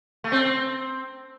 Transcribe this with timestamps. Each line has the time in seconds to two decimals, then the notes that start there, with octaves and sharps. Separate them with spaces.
0.24 A3
0.32 C4